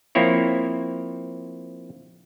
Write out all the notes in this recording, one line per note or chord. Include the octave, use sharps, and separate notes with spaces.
F3 A#3 C4 E4 C#5